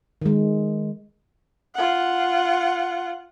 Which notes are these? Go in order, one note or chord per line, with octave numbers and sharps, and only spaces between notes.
D#3 G#3
F4 F#5